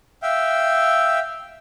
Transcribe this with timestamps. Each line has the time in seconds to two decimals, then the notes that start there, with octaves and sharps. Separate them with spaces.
0.23 E5 F5 G5